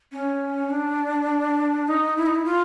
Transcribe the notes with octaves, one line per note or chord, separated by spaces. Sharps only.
C#4
D4
D#4
E4
D#4
E4
F4